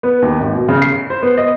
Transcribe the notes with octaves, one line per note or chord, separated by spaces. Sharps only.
B3
D#2
G#1
B2
C#3
C7
C5
B3
D#5